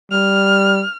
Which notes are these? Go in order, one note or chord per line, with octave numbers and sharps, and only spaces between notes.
G3 F6